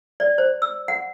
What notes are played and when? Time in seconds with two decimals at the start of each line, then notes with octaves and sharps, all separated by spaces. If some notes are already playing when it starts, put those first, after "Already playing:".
0.20 D5
0.38 C5
0.62 E6
0.88 F#5